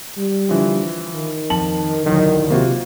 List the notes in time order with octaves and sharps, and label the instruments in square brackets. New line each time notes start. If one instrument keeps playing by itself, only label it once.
[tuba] G3
[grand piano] D3 E3 F3
[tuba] D#3
[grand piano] F2 A5 F#7
[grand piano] D1 B1 [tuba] D#3
[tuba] C3 [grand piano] A#3 F4 F#4